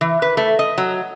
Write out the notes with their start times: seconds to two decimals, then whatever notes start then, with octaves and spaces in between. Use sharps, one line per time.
0.01 E3
0.22 B4
0.37 A3
0.59 D#5
0.78 F#3